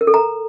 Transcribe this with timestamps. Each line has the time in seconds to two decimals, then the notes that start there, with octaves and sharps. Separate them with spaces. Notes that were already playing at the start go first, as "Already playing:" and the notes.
0.01 A#4
0.07 A4
0.14 A#5